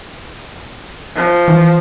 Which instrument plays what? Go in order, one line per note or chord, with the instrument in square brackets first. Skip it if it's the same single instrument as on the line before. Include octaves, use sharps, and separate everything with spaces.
[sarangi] F3
[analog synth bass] E3